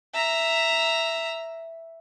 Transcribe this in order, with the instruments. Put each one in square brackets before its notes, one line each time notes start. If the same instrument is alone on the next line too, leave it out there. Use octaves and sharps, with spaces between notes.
[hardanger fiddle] E5 A#5